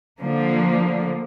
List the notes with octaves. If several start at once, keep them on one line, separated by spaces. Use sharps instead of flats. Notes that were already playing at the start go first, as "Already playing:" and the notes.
D3 F3 A#3